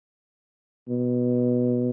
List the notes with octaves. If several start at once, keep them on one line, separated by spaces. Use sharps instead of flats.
B2